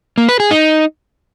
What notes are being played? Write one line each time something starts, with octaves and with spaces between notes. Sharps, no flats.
A#3
B4
G#4
D#4